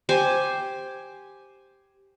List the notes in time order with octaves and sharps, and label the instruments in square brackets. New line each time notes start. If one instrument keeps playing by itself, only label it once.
[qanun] G4 C5 G#5